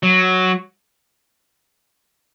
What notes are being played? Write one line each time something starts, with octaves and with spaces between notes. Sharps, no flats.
F#3